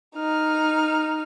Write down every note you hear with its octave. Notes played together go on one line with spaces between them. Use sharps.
D#4 F6